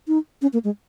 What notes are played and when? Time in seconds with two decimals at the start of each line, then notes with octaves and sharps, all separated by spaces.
0.08 D#4
0.42 C#4
0.53 A#3
0.64 G#3